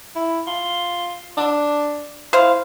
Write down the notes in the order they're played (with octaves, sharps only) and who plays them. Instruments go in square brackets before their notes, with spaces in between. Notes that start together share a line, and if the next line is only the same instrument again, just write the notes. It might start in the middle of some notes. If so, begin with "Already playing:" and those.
[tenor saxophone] E4
F4
D4
[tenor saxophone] E4 [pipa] C5 F5